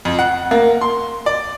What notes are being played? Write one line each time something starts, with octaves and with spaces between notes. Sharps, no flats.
F2
F#5
A#3
C6
D5